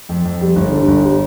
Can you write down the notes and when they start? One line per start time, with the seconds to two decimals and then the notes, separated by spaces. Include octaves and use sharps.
0.09 F2
0.25 F2
0.41 G3
0.56 G1
0.72 D3
0.88 G1
1.03 G3